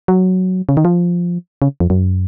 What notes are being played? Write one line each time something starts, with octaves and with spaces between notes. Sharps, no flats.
F#3
C#3
D#3
F3
C#3
F2
F#2